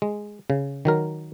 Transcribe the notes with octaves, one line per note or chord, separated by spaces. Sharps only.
G#3
C#3
D#3 F#3 A#4